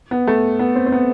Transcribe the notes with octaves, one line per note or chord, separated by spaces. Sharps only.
B3
A3
B3
C4
C4
B3